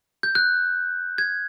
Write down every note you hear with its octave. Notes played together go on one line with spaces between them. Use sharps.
G6
F#6
G#6